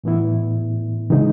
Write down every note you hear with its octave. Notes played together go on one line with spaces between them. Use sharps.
A2 E3 B3 E4
C#3 E3 G#3 D#4